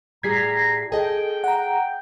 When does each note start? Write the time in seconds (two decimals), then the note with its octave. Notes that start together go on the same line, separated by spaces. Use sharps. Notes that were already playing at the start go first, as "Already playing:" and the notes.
0.23 A2 G3 G#4 A#5 G#6 B6 C7
0.92 G#4 A4 D#5 G5
1.44 F#5 A#5